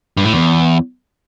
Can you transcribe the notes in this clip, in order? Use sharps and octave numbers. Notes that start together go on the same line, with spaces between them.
G2
A2
E2